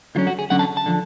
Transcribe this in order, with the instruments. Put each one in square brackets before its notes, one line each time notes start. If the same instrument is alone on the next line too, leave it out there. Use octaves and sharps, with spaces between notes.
[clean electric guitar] D3 F#3 C#4 F4
F#4
G#4
D3 F#3 C#4 F#5
A5
A5
D3 F3